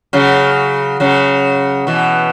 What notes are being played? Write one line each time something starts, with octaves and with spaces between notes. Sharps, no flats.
C#3 F#3
C#3 F#3
B2 E3